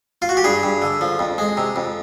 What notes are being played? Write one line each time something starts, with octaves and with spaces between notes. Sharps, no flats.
F4
F#4
G4
G2 G#4
G2
D3
F3
F2
G#3
C3
F2